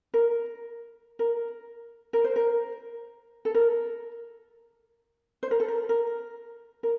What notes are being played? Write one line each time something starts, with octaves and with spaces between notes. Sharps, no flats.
A#4
A#4
A#4
C5
A#4
A4
A#4
C5
A#4
A4
A#4
A#4
A#4